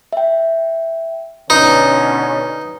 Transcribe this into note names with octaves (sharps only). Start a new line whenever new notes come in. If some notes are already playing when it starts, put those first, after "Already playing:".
E5 G5
B2 D3 C#4 D#4 B4